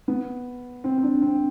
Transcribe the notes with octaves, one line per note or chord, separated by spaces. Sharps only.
B3
C4
C4
D4
C4